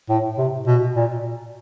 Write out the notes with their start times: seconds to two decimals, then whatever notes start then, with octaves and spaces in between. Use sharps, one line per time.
0.09 A2
0.38 C3
0.67 B2
0.96 A#2